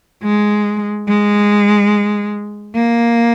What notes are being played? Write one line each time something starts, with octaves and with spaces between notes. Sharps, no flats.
G#3
G#3
A#3